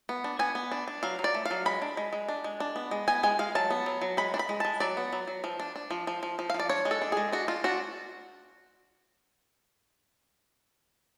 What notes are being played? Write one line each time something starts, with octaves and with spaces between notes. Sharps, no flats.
B3
D4
B3 G#5
B3
D4
D4
F#3 F5
F#3
D5
A3
F5
F#3
G#3 B5
D4
G#3
G#3
D4
G#3
D4
B3
G#3
B3 G#5
G#3 G#5
G#3 F5
F#3 A5
B3
F#3
F#3
G#3 B5
D4
B5
G#3
G#3 A5
F#3 D5
B3
F#3
F#3
F3
D4
D4
F3
F3
F3
F3
F5
F3
D5
D4 C#5
G#3
A4
D4
G#3 G#4
D4 F#4
D4 F4
D4 F#4